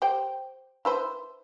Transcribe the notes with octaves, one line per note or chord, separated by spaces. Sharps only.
G4 C5 G5
E4 B4 C5